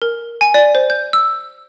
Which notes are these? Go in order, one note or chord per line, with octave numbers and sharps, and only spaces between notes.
A#4
G#5
D5
C5
G6
E6